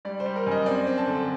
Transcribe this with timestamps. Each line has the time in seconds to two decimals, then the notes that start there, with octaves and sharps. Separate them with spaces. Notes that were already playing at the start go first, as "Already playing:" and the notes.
0.05 G3 D5
0.20 C5
0.26 G3
0.36 A#4
0.46 F#2
0.51 D#5
0.66 C4 D5
0.87 C4
0.98 A5
1.07 D3